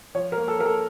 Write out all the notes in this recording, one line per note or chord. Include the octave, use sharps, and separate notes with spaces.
F3 C#5
A#4
A#3
A4
A#3 A#4
A4